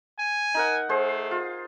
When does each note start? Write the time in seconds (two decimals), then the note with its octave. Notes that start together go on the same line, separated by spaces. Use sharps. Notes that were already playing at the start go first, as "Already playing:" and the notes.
0.19 G#5
0.54 D#4 A#4 F#5
0.89 A3 G#4 C5
1.31 F4